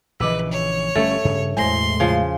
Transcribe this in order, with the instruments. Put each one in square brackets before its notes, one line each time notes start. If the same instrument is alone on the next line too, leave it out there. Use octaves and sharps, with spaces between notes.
[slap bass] A#1 C#3 E3 [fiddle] B4 [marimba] D#5 D6 E6
[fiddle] C#5
[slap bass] G1 G3 C#4 [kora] A3 [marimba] A4
[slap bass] G2 C#3
[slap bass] E1 A2 G#3 [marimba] E2 C5 A#6 [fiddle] C6
[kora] C#3 F3